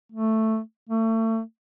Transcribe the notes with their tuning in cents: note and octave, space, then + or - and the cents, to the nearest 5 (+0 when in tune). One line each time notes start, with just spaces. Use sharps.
A3 +5
A3 +35